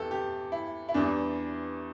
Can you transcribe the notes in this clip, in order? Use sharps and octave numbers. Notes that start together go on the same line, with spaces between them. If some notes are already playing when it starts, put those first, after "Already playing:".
Already playing: E2 E3 G4 A4
G4
E4
E4
E2 E3 G3 D4